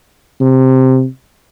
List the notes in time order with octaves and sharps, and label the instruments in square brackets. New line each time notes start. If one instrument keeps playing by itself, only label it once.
[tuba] C3